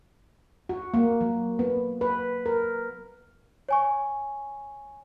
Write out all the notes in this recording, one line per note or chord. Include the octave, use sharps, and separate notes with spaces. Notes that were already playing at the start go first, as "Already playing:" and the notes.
F#4
A#3
F#3
B3
B4
A#4
C#5 G#5 C#6